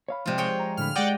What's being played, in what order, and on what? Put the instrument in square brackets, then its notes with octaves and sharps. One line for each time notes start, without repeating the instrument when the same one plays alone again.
[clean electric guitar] C#5 F5 B5
[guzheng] C3 F4 [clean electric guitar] F3 G#3 D5
[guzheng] G#4 C#5 G5
[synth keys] A#5
[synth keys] A2 D3 B5 [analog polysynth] F6
[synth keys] G#3 G4 [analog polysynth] D5 F#5 G5 [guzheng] D#5